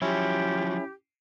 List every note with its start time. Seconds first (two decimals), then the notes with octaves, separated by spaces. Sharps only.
0.02 F3 F#3 C#4 E4 G4